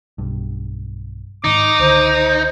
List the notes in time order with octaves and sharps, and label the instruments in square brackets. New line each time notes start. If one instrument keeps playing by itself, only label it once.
[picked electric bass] B1 G2
[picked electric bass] G#2 D#3 [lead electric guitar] D#4 [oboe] D6
[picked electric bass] C#2 D3 D#3 [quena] C5